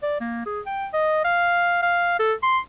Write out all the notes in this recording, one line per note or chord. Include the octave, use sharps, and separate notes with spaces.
D5
A#3
G#4
G5
D#5
F5
F5
A4
C6